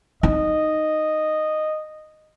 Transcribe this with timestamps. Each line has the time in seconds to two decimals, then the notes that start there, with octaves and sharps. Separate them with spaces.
0.23 D#4 D#5